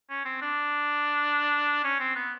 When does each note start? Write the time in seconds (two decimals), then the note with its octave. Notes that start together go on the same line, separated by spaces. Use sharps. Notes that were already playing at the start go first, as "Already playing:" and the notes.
0.10 C#4
0.25 C4
0.41 D4
1.84 C#4
2.00 C4
2.15 B3